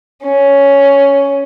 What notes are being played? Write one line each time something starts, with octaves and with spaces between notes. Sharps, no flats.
C#4